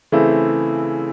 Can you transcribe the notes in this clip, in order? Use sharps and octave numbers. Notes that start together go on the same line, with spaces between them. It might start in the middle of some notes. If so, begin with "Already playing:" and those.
C#3 E3 A3 C4 E4